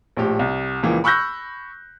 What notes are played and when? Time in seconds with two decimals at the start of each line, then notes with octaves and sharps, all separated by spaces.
0.17 A#1 A2 G4
0.39 C2
0.83 C#2 A#2 E3 F3 A#3
1.04 B5 C#6 E6 F#6 G6 A#6